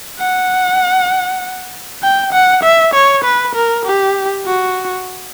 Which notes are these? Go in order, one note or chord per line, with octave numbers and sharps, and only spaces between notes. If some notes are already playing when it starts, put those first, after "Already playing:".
F#5
G5
F#5
E5
C#5
B4
A#4
G4
F#4